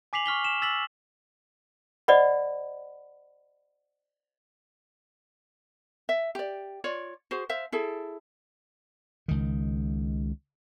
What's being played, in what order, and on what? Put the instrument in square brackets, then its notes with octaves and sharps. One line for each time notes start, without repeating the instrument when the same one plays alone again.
[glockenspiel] G#5 D6 B6 C7 F7 F#7
C#6 F6 B6 G7
E7
E6 A6 B6 E7 F#7
[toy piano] C5 D5 D#5 F#5 B5
[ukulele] E5
G4 D5
F4 C#5 D5
F#4 G#4 C5
C5 E5 F5
E4 G#4 A4
[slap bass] C#2 D#3